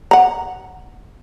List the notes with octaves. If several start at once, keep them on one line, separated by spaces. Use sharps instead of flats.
F#5 A#5